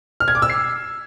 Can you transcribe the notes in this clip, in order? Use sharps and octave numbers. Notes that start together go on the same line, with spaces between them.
F6
G#6
D6
E6
C7